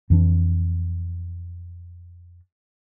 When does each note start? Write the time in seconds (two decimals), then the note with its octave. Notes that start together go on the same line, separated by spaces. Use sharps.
0.10 F2 E3 D4